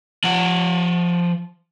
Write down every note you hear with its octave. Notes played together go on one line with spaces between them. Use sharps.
F3 F#5